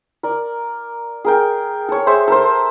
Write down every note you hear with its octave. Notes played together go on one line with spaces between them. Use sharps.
A#4 D5
G#4 A#4 G5
A4 C#5
G#4 C5 E5 C#6
A4 A#4 C5